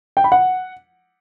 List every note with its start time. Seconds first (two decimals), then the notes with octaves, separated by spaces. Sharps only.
0.17 G5
0.24 B5
0.32 F#5